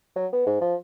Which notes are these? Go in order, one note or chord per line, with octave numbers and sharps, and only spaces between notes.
F#3
B3
G#2
F3